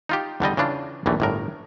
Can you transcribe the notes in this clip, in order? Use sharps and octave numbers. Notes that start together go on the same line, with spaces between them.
D#4 F4 G4
E2 D3 G3 D#5
C#3 E3 D4 F4
A#1 D#2 E3 A3
G1 A2 A#4